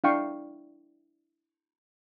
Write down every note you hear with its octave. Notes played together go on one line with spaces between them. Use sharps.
D4 E4 F5 G5 C#6